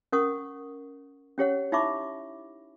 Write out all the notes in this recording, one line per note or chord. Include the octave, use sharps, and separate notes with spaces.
C#4 A#4 F#5 C#6 D#6
C#4 G4 C#5 F#5
D#4 E4 E5 B5 C#6 D6